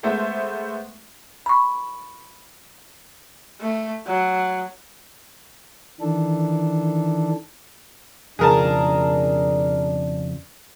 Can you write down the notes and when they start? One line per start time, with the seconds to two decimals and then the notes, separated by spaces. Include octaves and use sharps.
0.03 G#3 A3 B3 C5 E5
1.46 B5 C#6
3.61 A3
4.06 F#3
6.00 D#3 E3 D4 A4
8.39 F2 C#3 D4 F4 G#4 A#4 A5